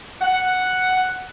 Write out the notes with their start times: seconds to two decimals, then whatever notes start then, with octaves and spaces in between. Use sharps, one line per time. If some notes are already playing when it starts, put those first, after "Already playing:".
0.22 F#5